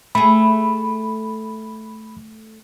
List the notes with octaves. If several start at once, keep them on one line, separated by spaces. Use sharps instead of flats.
A3 G#4 B5